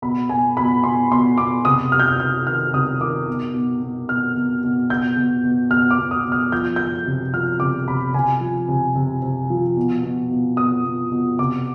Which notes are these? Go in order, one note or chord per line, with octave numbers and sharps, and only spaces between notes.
B2 B5
B2 G#5
B2 B5
B2 C6
B2 C6
B2 D6
C3 D#6
C3 F6
G6
F6
C3 G6
D#3 F6
C3 D#6
D#3 D6
B2
B2
B2
B2 F6
B2
B2
B2 G6
B2
B2
B2 F6
D6
B2
D#6
B2
F6
F3 G6
F3 G6
C3
F3 F6
C3 D6
C3 B5
C3 G#5
F3
C3
C3
C3
F3
B2
B2
B2
B2 D#6
B2
B2
C3 D6